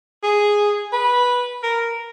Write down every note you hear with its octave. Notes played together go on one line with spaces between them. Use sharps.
G#4
B4
A#4